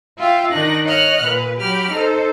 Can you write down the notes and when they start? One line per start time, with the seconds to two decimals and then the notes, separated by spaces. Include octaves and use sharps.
0.18 F4 E5 F5 G5
0.51 D#3 D4 D#4 F#6 A#6
0.86 C#5 D#5 F#5 F6 F#6
1.24 A#2 B4
1.59 F#3 G4 B5 F6
1.92 D#4 A4 C5